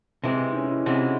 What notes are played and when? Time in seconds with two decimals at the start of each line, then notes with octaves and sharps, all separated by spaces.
0.24 C3 E3 G#3 E4
0.49 D#4
0.55 C#4
0.66 D#4
0.71 E4
0.86 C3 E3 G#3 F#4